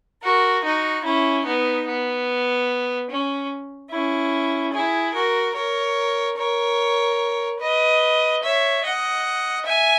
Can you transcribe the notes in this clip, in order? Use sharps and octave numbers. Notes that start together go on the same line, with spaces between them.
F#4 A#4
D#4 F#4
C#4 E4
B3 D#4
B3
C#4
C#4 E4
E4 G#4
F#4 A#4
A#4 C#5
A#4 C#5
B4 D#5
C#5 E5
D#5 F#5
E5 G#5